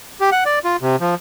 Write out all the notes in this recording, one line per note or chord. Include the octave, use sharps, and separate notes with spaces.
G4
F#5
D5
F4
C3
F3